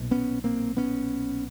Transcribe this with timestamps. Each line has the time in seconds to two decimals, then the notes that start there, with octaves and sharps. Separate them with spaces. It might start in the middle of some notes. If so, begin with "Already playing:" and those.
Already playing: B1 A#2
0.11 B3 C#4
0.44 A#3 C4
0.77 B3 C#4